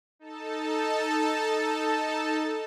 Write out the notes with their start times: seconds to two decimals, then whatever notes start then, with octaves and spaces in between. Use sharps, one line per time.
0.19 D#4 A4 A5